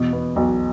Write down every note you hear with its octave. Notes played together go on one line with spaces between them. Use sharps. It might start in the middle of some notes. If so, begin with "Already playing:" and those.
Already playing: E2 B2
B3
B1